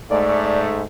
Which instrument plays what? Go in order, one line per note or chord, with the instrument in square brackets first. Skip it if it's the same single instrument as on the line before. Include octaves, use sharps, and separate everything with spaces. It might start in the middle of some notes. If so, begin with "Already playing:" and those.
[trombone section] G#2 A3 [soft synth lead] D5